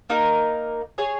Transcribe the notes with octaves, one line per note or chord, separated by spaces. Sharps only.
A#3 D#4 A#4
G#4 C#5 G#5